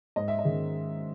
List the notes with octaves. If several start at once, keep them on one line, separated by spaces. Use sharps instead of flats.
G#2 D#5
E5
D#5
D#3 G#3 C#4